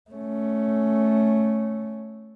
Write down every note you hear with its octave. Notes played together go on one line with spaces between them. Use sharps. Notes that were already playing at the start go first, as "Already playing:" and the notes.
A3 C#4